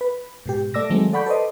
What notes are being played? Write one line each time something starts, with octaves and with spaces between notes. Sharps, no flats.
B4
G#2 B2 G4
A3 D5 D6 E6 A#6
D#3 F#3 G#3 A3 C4
A4 D5 F#5 B5 C#6 G6
A4 B4 C5 D5 D#5